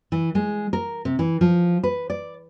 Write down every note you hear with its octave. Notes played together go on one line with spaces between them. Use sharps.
E3
G#3
A#4
C3
E3
F3
B4
D5